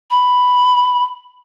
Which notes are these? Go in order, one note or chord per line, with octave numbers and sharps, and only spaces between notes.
B5